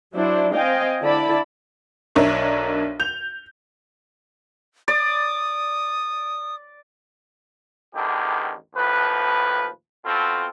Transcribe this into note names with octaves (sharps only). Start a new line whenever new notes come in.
F#3 D4 E4 C5
C4 D#5 F5 G5 G#5
D3 E4 D5 A5 B5
B1 D4 A#4 C#5 E5
G6 F7
D5 D#6
A1 E2 D3 D#3 G4
D#2 A2 F3 B4
B2 C4 F4 A4